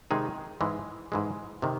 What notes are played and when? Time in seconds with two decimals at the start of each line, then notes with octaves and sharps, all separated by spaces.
0.11 C3 D#3 G#3 D#4 G#4
0.61 G#2 E3 G#3
1.12 G#2 E3 G#3
1.62 C3 D#3